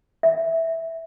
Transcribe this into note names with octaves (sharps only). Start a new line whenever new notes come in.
E5